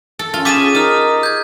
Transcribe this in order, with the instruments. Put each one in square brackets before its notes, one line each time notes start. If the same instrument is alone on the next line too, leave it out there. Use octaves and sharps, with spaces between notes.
[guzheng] A4
[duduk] C#4 [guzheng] F4 [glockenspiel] A6
[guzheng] G4 G#4 A5 [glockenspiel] D6 B6 D#7
[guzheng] D#4 [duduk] A#4 [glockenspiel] D#6 F6
[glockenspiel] G6 G#6